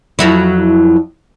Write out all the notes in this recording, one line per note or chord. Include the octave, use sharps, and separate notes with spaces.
F2 F#3 E4